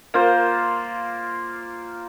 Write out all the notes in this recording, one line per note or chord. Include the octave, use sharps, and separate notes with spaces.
A#3 F4 C5